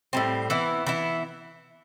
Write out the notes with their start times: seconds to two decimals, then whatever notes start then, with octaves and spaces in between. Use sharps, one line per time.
0.13 A2 G3 C4
0.50 E3 B3 E4
0.86 E3 B3 E4